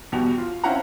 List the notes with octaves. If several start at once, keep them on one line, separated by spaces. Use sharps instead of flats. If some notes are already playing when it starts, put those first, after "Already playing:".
E2 B2 G3 F#4 G4 F7
F4
C4 C#4 E4 F5 F#5 A#5